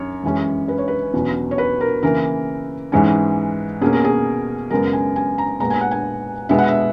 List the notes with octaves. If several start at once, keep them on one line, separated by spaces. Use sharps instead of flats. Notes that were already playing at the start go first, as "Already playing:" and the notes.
Already playing: F#2 C#5
F#2 E3 G#3 C#4
B4
C#5
B4
E2 B2 F#3 C#4
C#5
B4
A#4
C#3 E3 A#3 A#4
G#2 E3 G#3 C#4
B2 A#3 C#4 G#4
A#4
G#4
F#2 C#3 G#3 B3 A#4
G#5
G#5
A#5
A#2 G#3 B3 A#5
G#5
F#5
G#5
B2 G#3 B3 E5
F#5
E5